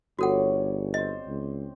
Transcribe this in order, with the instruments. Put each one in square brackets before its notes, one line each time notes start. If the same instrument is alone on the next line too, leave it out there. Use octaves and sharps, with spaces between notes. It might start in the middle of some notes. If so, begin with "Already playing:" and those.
[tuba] G1 [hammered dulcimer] C#3 C#5 D5 [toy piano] F#4 A4 F#5
[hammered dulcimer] C4 C5 [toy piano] D#5
[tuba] C#2